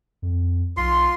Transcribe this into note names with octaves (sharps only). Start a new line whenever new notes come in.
F2
B1 F4 C6